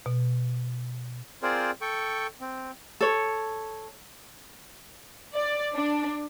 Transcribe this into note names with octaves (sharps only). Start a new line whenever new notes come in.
B2
C4 F4 G#4 A#4 C5 D5
A4 G5 C#6
C4
A4 C#5
D5
D4